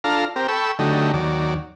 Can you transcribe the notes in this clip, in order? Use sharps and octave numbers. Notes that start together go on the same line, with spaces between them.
D4 F4 A4 F5 A#5
C4 G4 A#4
A4 G5 B5 C#6 E6
D3 F#3 A3 D#4 G4
D#2 F#3 D5